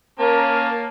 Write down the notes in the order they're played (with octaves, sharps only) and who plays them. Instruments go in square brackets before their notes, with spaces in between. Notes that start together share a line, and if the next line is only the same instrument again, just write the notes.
[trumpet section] A#3 [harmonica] C#4 [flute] A#4 [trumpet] A5